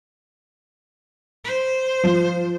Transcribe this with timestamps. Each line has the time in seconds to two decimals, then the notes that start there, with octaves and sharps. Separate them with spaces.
1.45 C5
2.04 F3